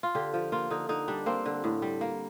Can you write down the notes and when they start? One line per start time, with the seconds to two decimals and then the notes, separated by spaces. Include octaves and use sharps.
0.03 F4
0.15 D3 G4
0.34 F3
0.52 A#3 F4
0.70 D3 D#4
0.89 D3 D#4
1.08 G3 D4
1.26 A#3 C4
1.46 D3
1.64 A2
1.82 G3
2.01 A#3